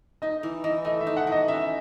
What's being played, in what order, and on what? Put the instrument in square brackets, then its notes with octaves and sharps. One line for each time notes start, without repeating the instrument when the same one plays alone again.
[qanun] D#4 [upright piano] D#5
[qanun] E3
[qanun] E3 [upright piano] D#5
[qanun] A3 [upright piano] D#5
[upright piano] E5
[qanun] D#4
[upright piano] F#5
[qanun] E3 [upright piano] D#5
[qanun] C#4 [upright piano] E5